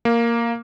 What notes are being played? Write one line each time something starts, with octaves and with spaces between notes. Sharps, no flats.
A#3